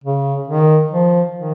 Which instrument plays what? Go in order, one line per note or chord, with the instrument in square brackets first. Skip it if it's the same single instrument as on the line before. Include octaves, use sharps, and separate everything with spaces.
[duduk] C#3
D#3
F3
D#3